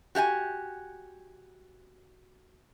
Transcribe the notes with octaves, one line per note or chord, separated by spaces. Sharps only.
F#4 G4 F5 G#5